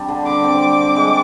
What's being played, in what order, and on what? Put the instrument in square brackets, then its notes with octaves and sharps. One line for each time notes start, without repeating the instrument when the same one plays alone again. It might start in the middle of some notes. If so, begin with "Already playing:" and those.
Already playing: [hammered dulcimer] G3 C4 D4
D3
[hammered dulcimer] D3 [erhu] D6
[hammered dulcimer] C4
G3
C4
G#3